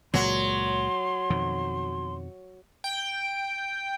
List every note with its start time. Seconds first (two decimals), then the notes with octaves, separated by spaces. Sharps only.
0.14 C#2 A#2 F#3 G#3 C6
1.30 F2 B2 D#3
2.84 G5